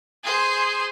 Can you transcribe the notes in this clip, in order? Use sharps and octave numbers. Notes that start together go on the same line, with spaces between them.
G#4 C5